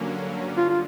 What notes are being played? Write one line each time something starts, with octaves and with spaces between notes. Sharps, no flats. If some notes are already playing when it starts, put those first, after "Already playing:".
Already playing: G2 D3 F#3 A#3 C#4
G2 D3 F4
F4